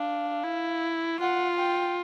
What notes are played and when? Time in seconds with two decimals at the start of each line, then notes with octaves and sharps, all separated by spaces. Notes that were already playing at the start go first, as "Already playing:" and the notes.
Already playing: D4 F5
0.44 E4
1.20 F4 F#5
1.58 G5